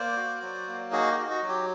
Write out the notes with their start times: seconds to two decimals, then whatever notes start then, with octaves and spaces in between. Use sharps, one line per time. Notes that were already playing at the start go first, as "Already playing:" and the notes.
Already playing: A#3 C5 D5
0.17 F#4
0.42 F#3
0.67 A#3
0.92 D#4 F#4 G#4
1.12 G4
1.17 F#4
1.30 F#4
1.42 F#3
1.49 G4